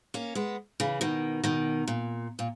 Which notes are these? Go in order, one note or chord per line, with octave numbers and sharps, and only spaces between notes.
A#3 C#4
G#3 B3
C#3 E3
B2 D#3
B2 D#3
A#2
A#2